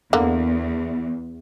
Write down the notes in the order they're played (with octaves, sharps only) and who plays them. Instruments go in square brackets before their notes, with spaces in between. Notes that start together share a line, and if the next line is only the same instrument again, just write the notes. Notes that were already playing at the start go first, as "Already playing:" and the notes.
[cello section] E2 [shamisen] D3 A#3